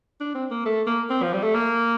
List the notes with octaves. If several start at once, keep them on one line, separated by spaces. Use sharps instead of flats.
D4
C4
A#3
A3
A#3
C4
F3
G3
A3
A#3